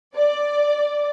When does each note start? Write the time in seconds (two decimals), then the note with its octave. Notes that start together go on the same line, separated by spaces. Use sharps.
0.14 D5